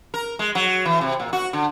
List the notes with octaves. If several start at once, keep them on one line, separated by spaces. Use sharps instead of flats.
A#4
G#3
F#3
E3
C3
A#2
F#4
D3